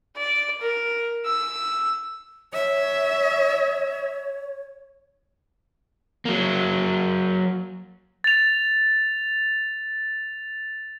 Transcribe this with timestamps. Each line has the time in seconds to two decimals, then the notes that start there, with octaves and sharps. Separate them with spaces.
0.17 D5
0.61 A#4
1.26 E6
2.54 C#5 E5
6.25 F#3 A#3
8.24 A6 F7